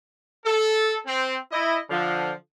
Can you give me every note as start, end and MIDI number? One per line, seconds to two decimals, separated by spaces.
0.45 0.97 69
1.07 1.36 60
1.52 1.78 64
1.52 1.78 75
1.90 2.32 50
1.90 2.32 53